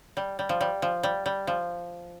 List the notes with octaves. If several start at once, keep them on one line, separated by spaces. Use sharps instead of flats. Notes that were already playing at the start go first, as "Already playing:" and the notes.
G3
G3
F3
G3
F3
G3
G3
F3